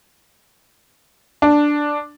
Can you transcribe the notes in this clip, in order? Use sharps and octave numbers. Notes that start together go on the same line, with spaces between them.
D4